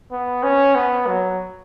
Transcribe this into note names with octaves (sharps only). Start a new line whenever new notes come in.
B3
C#4
B3
F#3